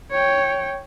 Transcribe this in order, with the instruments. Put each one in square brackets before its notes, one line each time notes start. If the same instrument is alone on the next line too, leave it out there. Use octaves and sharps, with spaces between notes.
[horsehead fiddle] C#5 G5